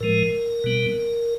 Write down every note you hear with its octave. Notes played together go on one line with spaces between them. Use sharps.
A2 F3 G#3 A#4
B2 G3 B3